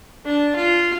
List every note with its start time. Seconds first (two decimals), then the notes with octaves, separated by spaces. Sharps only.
0.25 D4 A5
0.56 F4